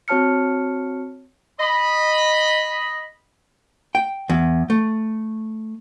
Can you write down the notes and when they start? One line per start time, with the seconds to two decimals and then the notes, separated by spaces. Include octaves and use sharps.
0.08 C4 F#4 C#5 A5 F6 C#7
1.59 D#5 B5
3.95 G5
4.29 E2
4.70 A3